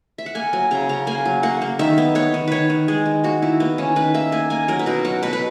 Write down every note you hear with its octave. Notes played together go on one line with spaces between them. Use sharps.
E5
F#5
A#3 G#5
F#3 G#5
C#3 A#5
C#3 A#5
A#3 G#5
F#3
A#3 F#5
A#3
D#3 E5
B3
B3 C#5
D#3
D#3 B4 C#5
D#3
G#3 G#4
D#3
A#3 F#4
D#3 E4
A#3 B3
D#3 C#4
D#3 B4
A#3 E5
A#3 G#5
A#3 G#5
F#3 A#4
B4
B2 A#4
F#3 F#5
B2 B4
B4